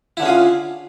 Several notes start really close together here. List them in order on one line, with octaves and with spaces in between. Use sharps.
E4 D3 C#4 G#4 F4